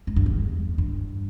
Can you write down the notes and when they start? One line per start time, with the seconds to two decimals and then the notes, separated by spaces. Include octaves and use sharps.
0.07 G#2
0.16 G2
0.26 E2
0.78 G2